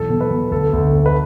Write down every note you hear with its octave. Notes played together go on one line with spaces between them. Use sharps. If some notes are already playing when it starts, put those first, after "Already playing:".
Already playing: B1 E2 A4
B2
B4
B2
D2 A4
D2
D2
B4